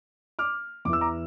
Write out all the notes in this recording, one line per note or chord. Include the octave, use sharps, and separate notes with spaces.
D6 F6
E2 E3 D6 E6
A#5 D6